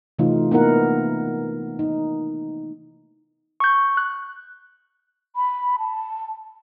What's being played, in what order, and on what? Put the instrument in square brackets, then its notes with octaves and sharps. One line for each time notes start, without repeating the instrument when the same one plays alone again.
[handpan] C3 E3 A3 D#4 F4
A#3 B3 D#4 E4 A#4 F#5
D#4
[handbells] C#6 G6
F#6
[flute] B5
A5